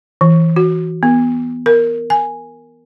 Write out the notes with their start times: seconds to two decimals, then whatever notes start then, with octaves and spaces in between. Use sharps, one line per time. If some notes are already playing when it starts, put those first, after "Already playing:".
0.21 E3
0.56 F#4
1.03 B3
1.66 A#4
2.10 G#5